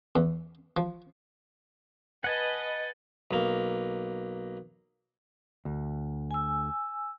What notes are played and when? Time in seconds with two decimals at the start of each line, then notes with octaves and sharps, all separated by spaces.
0.16 E2
0.77 F3
2.24 B4 D#5 F#5 G#5 A5
3.31 B1 A#3
5.65 D2
6.31 G#5 E6